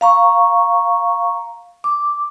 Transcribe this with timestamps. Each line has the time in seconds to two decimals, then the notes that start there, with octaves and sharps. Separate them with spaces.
0.01 F5 A#5 C#6
1.84 D6